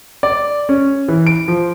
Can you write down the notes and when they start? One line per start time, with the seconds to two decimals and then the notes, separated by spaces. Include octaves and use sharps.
0.23 D5
0.69 C#4
1.08 E3
1.27 D7
1.48 F3